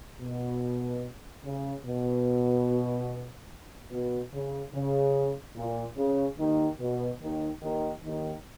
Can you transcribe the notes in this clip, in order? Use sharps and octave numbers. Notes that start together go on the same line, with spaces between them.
B2
C#3
B2
B2
C#3
C#3
A#2
C#3
D#2 D#3
B2
D#2 D#3
D#2 D#3
D#2 D#3